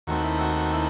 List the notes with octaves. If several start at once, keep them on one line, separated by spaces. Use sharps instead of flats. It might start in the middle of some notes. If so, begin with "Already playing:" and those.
D#2 D#3 A3 C4 F#4
E4
F#4
F#4
E4